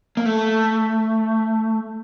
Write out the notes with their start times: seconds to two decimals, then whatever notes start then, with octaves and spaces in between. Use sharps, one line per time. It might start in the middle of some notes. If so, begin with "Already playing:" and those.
0.17 A#3
0.26 A3